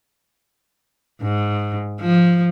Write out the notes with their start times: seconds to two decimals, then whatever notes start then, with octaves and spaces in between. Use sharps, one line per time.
1.22 G#2
2.00 F3